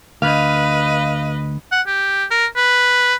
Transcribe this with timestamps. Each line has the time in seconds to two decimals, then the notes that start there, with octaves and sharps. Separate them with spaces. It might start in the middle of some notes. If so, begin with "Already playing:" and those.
0.22 D2 B4 D#5 F5
1.72 F#5
1.87 G4
2.31 A#4
2.56 B4